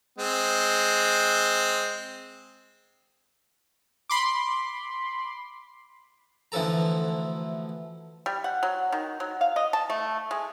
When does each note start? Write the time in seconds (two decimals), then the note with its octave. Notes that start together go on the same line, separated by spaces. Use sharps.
0.18 G#3 C4
4.09 B5 C6 D6
6.52 D2 E3 F3 A4 A#5
8.26 G3
8.44 F#5
8.63 F#3
8.92 D#3
9.20 F#3
9.41 F5
9.56 D#5
9.73 A5
9.90 A3
10.31 G#3